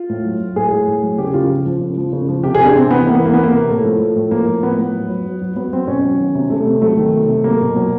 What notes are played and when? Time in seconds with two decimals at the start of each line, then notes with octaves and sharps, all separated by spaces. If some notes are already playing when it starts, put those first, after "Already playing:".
Already playing: F4
0.09 A2
0.25 F#3
0.40 F#3
0.56 A2 G#4
0.71 A2
0.88 A2
1.03 F#3
1.18 C#3 G4
1.34 C#3 F4
1.49 F3
1.66 F3
1.81 C#3
1.97 F3
2.13 C#3
2.29 F3
2.43 C3 G4
2.55 G#4
2.60 C3 D4
2.75 C3 C4
2.91 E3 B3
3.07 E3 A#3
3.15 B3
3.23 E3 A#3
3.34 B3
3.38 E3
3.43 A#3
3.53 C3
3.69 A2 A3
3.85 F3
4.00 F3
4.16 A2
4.31 F3 A#3
4.48 F3
4.62 A2 B3
4.78 A2
4.94 F#3
5.09 F#3
5.25 F#3
5.42 F#3
5.56 F#3 B3
5.73 F#3 C4
5.88 B2 C#4
6.04 F#3
6.19 D#3
6.35 C3
6.50 C3 A3
6.67 C3
6.82 F#3 A3
6.97 D#3
7.13 C3
7.29 C3
7.44 F#3 A#3
7.61 B2
7.76 F#3